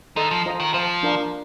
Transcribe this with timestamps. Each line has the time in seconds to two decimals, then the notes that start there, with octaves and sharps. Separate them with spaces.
0.16 D#3 A4 D#5 A5 C6
0.31 F3
0.46 F4 C5 D#5 A#5
0.60 D#3
0.74 F3 C5 F5 A5
1.03 D4 F4 A#4 F5